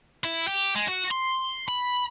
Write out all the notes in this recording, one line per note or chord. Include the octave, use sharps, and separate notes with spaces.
E4
G4
G#3
F#4
C6
B5